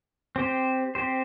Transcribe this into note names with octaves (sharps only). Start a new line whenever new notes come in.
C4 G4 C5
C4 G4 C5